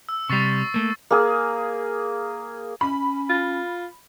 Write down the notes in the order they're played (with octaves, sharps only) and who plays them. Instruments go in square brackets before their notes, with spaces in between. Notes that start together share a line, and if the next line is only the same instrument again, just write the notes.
[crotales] E6
[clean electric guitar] C3 G3 [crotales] C#6 A6 C7
[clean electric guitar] A3 A#3
[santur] A#3 G#4
[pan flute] C#4 [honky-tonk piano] B5
[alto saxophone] F4